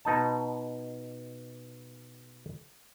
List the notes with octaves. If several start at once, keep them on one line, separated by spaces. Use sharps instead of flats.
B2 D#4 A5